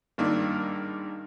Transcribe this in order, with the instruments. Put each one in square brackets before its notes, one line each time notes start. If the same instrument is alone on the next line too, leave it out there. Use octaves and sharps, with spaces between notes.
[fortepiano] G#1 G2 D#3 A#3 D4 E6